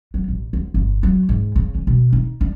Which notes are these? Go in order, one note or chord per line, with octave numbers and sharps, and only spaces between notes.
F#3
A1
D2
G1
F#3
G#2
C#3
C#4
B2
D#4
D4